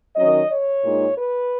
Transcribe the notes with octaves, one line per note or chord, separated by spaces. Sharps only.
D#3 F#3 C#4 D#5
C#5
A#2 G#3 D#4
B4